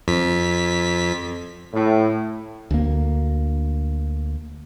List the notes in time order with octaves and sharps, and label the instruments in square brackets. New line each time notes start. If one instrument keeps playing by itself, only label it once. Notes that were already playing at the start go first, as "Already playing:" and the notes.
[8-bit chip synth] F2 B6
[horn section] A2
[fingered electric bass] D2 A#3